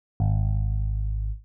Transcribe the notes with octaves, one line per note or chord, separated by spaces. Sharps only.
G#1